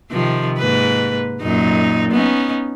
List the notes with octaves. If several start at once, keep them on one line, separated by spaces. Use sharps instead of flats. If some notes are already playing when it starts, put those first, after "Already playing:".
C3 D#3 F3
G#2 A#3 B4
F#2 A#2 D#4
B3 C#4 D#4